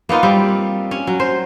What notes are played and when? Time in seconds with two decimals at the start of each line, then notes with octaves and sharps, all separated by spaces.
0.09 A#3 B3 D#4 F4
0.23 G3 C4
0.91 C#4
1.07 F#3
1.20 C5